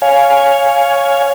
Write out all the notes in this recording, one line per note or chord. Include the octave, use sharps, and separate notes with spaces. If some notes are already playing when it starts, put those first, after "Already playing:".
C#5 F5 G#5